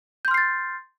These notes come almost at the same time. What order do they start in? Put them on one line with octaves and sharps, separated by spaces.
G6 C6 F6 C7 A6